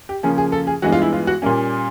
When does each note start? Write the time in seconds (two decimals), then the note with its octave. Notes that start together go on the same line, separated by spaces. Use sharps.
0.09 G4
0.23 C#3 F3 A#3 C#4 G#4
0.38 G#4
0.52 A4
0.67 G#4
0.82 G2 E3 G#3 B3 F#4
0.92 F4
1.02 E4
1.13 F4
1.27 F#4
1.42 A#2 G3 A#3 C#4